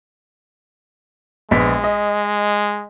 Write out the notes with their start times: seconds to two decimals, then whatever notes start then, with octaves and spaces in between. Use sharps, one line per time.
1.51 A#1 G#3 B3 B6
1.84 D#5